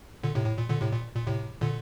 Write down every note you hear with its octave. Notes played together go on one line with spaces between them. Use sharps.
A#2 D3
A2 C3
A2
A#2
A#2 D3
A2 C3
A#2
A#2
A2 C3
A#2 D3